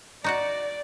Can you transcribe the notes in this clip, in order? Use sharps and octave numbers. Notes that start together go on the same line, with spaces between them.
D#4 F#4 D5 F#5